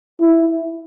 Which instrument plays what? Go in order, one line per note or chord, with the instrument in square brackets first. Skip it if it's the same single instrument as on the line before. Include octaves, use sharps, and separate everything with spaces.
[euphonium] E4